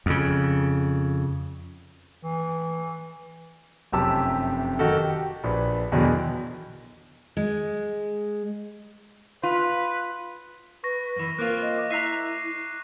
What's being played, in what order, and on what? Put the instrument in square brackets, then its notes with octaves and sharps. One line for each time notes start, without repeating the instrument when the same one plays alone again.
[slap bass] F2 C#3
[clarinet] E3
[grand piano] F1 F#2 C3 G4 A5 E6
D#3 F#4 A4
G4
A#1 D4 B4
E2 B2 D3 D#3 F#3
E3
[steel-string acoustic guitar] G#3
[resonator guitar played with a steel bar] F4 [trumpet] B4
[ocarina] B4 [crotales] C#6 A#6
[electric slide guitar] F#2 E3
[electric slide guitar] A#3 C4 F4 [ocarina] A#4 [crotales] F#6
[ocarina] D#5
[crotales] D6
[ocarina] E4 [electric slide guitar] E5 A#5 [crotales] F#6 C7 D#7